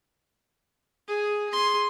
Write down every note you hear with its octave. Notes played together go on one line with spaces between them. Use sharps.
G#4
G#4 C6